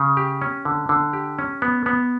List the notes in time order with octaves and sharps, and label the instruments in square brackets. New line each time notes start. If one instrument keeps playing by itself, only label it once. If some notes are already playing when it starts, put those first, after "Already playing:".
Already playing: [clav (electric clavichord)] C#3
G4
C#4
D3
D3
G4
C#4
B3
B3